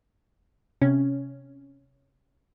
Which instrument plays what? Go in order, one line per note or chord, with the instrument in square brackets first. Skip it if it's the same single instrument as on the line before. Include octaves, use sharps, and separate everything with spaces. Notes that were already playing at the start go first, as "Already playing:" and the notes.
[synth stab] C3 C#4